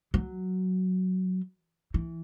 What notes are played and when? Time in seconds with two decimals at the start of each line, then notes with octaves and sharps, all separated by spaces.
0.14 F#3
1.94 E3